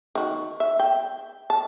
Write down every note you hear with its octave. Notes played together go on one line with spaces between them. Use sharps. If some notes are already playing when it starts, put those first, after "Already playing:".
D#3 F#4
E5
G5
A5